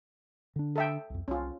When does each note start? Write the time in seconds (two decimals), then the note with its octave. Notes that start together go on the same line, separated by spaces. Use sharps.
0.56 D3 D4
0.76 A4 E5 G5
1.10 C2 F2
1.28 C2 C#4 F4